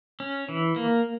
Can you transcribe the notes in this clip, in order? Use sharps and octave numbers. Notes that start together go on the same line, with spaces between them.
C#4
E3
A#3